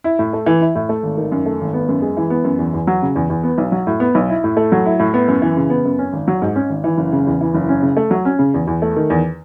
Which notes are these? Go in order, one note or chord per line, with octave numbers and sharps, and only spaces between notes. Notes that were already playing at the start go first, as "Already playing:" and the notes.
E4
A2
A3
E3
E4
A2
A3
G#1
D#3
F#2
A3
G#1
B3
F#2
G#3
E3
B3
F#2
E2
E2
F#3
C#3
E2
E2
B3
B1
F#3
A2
B3
B1
E4
A2
A3
F#3
E4
A2
B3
F#2
E3
C#3
B3
F#2
C#4
G#1
F#3
G#2
C#4
G#1
E3
F#1
C#3
E2
E3
F#1
C#4
C#3
A3
F#3
C#4
C#3
E2
E2
A3
D#3
E2